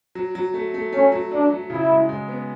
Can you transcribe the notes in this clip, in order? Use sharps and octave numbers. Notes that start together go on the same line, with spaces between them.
F#3
F#3
A3
A3
A3 C#4
F#3
F#3 D4
F#3
C#3 E4
G#3
G#3
B3